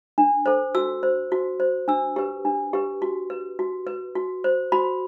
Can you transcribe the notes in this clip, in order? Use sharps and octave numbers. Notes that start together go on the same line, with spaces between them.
D4
A4 C5
F#4 E6
C5
F#4
C5
D4 E6
G4 B4
D4
G4 B4
F#4
B4
F#4
B4
F#4
C5
F#4 B5